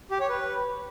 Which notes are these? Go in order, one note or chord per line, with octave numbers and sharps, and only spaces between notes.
G4
C#5
B4